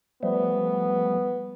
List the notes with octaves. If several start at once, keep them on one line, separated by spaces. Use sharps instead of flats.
F3 G3 A3 B3